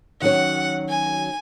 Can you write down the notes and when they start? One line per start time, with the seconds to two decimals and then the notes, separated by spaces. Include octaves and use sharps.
0.21 D#3 F#3 C#4 F#4 C#5 F#5
0.89 G#5